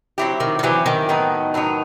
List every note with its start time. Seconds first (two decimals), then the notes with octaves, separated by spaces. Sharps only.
0.18 F#3 C4 E4 G4
0.40 D#3
0.59 D#3
0.63 E3 F#3 C4 E4 G4
0.86 D#3
1.09 A2 F#3 B3 D#4
1.54 A2 F#3 B3 D#4